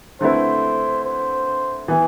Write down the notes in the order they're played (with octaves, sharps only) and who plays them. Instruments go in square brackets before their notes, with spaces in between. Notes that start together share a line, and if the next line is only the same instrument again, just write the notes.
[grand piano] D3 A3 C4 E4 B4 [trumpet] C5
[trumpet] C5
[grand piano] E3 B3 E4